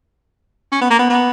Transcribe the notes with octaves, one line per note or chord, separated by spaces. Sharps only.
C#4
B3
A#3
B3
B3